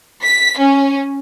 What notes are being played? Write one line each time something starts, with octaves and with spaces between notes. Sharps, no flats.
B6
C#4